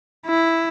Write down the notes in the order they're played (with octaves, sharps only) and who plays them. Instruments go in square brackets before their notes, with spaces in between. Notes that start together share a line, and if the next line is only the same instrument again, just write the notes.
[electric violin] E4